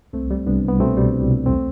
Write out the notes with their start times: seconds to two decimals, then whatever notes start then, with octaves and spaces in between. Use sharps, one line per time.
0.13 C2 A3 C4
0.31 G3
0.47 C2 B3 D4
0.64 C2 B3
0.80 B2 A3 C4
0.96 G3
1.14 C2
1.29 C2
1.46 E2 A3 C4